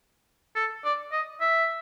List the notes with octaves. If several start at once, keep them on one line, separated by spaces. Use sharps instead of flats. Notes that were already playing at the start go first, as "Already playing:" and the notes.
A4
D5
D#5
E5